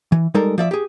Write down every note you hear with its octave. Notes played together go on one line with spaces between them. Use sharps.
E3
G3 G#3 D#4 A4 A#4
F3 D5 E5
G4 G#4